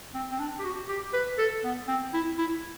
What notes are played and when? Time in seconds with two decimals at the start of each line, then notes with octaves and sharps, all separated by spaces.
0.14 C4
0.31 C4
0.39 D4
0.59 G4
0.64 F#4
0.89 G4
1.13 B4
1.38 A4
1.64 B3
1.88 C4
2.13 E4
2.38 E4